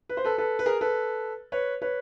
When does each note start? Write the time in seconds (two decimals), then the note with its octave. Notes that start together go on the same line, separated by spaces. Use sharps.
0.09 B4
0.17 C5
0.24 A4 B4
0.38 A4 B4
0.59 B4
0.66 G#4 A#4
0.81 A4 B4
1.52 B4 C#5
1.82 B4 C#5